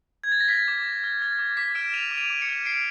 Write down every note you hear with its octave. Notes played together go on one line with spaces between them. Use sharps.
G#6
A6
A#6
F6 B6
D6
D6
F6
F6 A6
D6
D6 B6
F6 D7 E7
F6 D#7 F7
D6
D#7 F7
D6
C#7 D#7
F6
F6 C7 D7